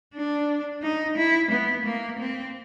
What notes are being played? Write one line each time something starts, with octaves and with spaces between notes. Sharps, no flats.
D4
D#4
E4
B3
A#3
C4